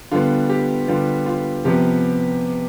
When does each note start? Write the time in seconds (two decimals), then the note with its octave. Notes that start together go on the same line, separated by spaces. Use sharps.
0.11 D3 G3 B3 F4
0.49 G4
0.88 D3 G3 B3 F4
1.26 F4
1.65 C3 F3 B3 G4